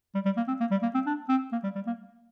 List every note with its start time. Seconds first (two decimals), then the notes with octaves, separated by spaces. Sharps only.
0.15 G3
0.25 G3
0.37 A#3
0.48 C4
0.60 A#3
0.71 G3
0.82 A#3
0.94 C4
1.06 D4
1.29 C4
1.52 A#3
1.64 G3
1.75 G3
1.87 A#3